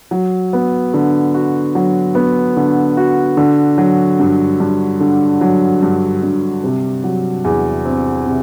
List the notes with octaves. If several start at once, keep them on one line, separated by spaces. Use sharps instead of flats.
F#3
B3
D3
F#4
F#3
B3
D3
F#4
D3
F#3
G2
G2
D3
F#3
G2
G2
C3
F#3
E2
C4
C3